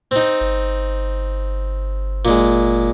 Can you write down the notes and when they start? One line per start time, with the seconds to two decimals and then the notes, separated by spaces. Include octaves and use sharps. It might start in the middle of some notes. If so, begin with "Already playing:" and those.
0.11 C4 D#4
0.41 G1
2.25 A#2 G#3